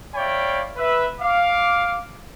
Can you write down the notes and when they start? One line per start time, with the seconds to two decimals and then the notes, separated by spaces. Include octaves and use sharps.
0.15 C#5 D5 E5 F5 G5 B5
0.77 B4 E5
1.20 F5 D6